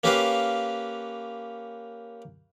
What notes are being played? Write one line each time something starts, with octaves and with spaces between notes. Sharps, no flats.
A#3 C#4 G4 A#4 B4 F5